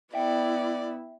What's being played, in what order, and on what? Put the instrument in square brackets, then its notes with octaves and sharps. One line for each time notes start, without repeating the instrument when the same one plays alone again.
[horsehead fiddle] B3 E4 [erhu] D5 [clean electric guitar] E5 G5